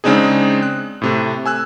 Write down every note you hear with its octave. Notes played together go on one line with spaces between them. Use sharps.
C#3 G#3 C4 D4 D#4 G#4
F#6
A2 C3 A3
G#5 E6 F#6